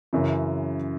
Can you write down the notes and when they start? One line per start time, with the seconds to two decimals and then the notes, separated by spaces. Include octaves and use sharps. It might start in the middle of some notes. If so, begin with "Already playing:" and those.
0.13 F#2 C#3 E3